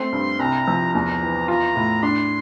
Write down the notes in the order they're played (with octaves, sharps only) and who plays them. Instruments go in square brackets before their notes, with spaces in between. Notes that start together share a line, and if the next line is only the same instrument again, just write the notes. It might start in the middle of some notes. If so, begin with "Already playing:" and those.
Already playing: [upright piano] A3 C4 [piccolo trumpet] C6
[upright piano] G2
[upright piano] C2 [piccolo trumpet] A#5
[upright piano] F3
[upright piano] E2 [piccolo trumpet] A#5
[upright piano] E3
[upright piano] F4 [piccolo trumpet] A#5
[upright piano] A2
[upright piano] D4 [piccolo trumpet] C6